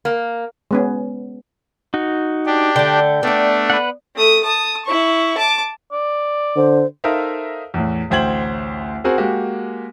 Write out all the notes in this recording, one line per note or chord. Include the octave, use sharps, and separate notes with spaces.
A#3
G#3 B3 C#4
D#4 F#4
D4 G4
D3 A3 G5
A3 B3 D4 D5
B4 F#5
A3 D#6
A5 D#6
E4 C#6
A5 D6
D5
D3 C5
D#4 A4 A#4 C5 E5 F5
E2 A2
A1 D2 C5 G5 G#6 F#7
C4 F#4 G#4 A#4 C5
G#3 A#3 F#4 G4